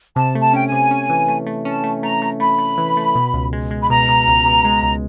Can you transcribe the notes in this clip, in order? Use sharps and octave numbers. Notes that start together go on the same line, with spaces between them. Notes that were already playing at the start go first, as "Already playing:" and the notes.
C3 A5
A3
A5
C#4 G5
G#5
C3
C#4
E3
A3
A3
C#4 A5
A3
A3 A#5
A3
A3 B5
A3
E3
A3
B2
C#2
G#3
G#3
B5
B2 A#5
B2
C#2
B2
G#3
C#2